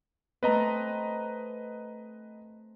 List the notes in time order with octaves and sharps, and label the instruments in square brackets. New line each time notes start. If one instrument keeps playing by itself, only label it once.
[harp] A3 C4 [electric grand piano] B4 D#5 A#5